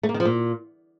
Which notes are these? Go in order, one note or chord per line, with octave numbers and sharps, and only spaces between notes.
A3
A#3
D#3
F3
A#2